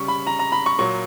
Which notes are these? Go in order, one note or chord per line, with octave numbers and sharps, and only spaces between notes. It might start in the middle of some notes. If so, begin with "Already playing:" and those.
Already playing: C#3 G3 C#6
B5
A#5
A#5
B5
C#6
A#2 F#3 C#6